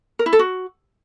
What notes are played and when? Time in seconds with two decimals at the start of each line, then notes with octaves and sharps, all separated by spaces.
0.19 A#4
0.26 E4
0.33 A4
0.39 F#4